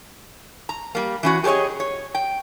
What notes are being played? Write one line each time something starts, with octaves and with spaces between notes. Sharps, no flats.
A#5
G3 A#3
E3 C#4 F#4
G4 G#4 C5 C#5 D#5
C#5
G5